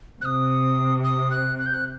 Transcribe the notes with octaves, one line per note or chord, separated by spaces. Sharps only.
C3 D#6 F#6
D#6
F#6
F#6
G6
F#6